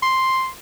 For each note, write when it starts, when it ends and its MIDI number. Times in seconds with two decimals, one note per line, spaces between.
0.03 0.49 84